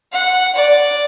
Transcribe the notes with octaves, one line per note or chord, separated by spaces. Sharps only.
F#5
D5